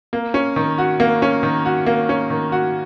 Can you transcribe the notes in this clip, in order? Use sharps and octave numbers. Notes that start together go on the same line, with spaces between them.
A#3
C#4
D#3
F#4
A#3
C#4
D#3
F#4
A#3
C#4
D#3
F#4